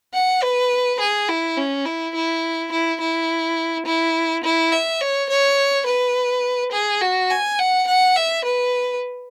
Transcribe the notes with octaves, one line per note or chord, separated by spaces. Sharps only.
F#5
B4
G#4
E4
C#4
E4
E4
E4
E4
E4
E4
E5
C#5
C#5
B4
G#4
F#4
G#5
F#5
F#5
E5
B4